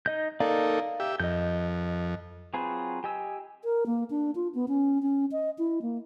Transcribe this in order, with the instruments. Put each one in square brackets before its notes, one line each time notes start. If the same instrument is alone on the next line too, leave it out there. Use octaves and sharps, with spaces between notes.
[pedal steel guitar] D#4 D#5 G6
[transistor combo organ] A#3 D#4 A4 [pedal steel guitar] D5 F5 A#5
[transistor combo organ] G4 E5
[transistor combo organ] F2 [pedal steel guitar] D#5 G6
[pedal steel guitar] F#3 C4 F4 G#4 B4
G4 D#5 G#5 E6
[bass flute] A#4
A#3
D4
F4
B3
C#4
C#4
D#5
E4
A#3